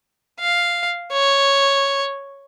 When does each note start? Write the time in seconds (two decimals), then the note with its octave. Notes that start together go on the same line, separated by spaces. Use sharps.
0.40 F5
1.12 C#5